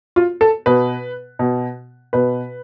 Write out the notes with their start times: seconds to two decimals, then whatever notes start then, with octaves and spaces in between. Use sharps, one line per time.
0.16 F4
0.41 A4
0.66 B2 B4
1.39 B2
2.13 B2 B4